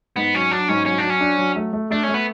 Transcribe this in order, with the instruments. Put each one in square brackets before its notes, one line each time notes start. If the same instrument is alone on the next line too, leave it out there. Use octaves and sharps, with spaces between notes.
[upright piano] G#2 [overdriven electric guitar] B3
[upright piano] F#3 [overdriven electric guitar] C#4
[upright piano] F#3 [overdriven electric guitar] D4
[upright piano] G#2 [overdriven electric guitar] C#4
[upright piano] F#3 [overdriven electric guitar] C#4
[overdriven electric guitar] D4
[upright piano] F#3
[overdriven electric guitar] C#4
[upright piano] D4
F#3
A3
A3
[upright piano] A3 [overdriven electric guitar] D4
[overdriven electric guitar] C#4
[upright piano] A3
[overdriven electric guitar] B3